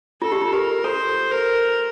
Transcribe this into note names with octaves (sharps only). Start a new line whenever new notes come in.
F4 A4
G4
F4
G4 A#4
A4 C5
A#4